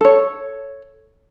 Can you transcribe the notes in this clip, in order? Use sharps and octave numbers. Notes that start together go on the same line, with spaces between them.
A4 C#5